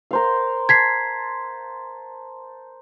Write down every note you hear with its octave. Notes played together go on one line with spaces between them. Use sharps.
A#4 C5 F5
A5 G#6 B6 C7